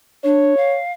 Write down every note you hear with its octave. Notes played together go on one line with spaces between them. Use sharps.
D4 C#5
F5